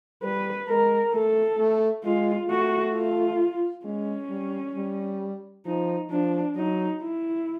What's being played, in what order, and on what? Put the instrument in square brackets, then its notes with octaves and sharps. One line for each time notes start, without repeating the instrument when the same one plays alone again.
[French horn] G3 [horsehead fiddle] B4
[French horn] G#3 [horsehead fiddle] A#4
[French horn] A3 [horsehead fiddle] A4
[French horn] A3
[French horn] G#3 [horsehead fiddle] F4
[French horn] A3 [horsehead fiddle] F#4
[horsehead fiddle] F4
[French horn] G#3 [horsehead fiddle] C#4
[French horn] G3
G3
[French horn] F3 [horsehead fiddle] D#4
[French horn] F3 [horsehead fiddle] D4
[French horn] F#3 [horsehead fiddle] D#4
[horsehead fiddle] E4